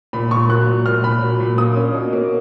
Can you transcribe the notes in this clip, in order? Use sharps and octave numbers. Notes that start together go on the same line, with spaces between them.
A#2 B5
A#2 C#6
F#3 F#6
A#2
A#2 F6
A#2 B5
F#3
A#2
A#3 D#6
C#4
B2
A#3